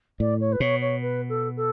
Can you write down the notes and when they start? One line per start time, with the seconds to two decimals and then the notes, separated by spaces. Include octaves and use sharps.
0.19 A2 D5
0.40 C#5
0.52 B4
0.60 B2 C#5
0.81 C#5
1.02 B4
1.29 A4
1.56 A4